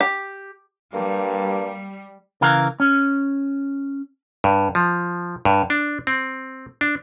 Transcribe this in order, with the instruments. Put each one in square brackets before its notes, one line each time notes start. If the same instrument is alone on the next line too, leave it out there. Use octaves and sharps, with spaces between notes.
[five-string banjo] G4
[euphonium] G2 [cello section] G3 [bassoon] A#3
[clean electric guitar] C#3 E3 A#4 F5
C#4
[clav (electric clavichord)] G2
F3
G2
D4
C4
D4